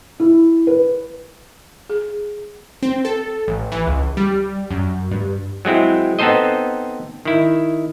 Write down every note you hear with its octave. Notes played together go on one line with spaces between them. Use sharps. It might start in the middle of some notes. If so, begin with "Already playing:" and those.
E4
B4
G#4
C4
A4
A1
E3
C#2
G3
F#2
G2
F#3 G#3 C4 E4
B3 C4 D#4 A4 C5 D#5
D#3 E4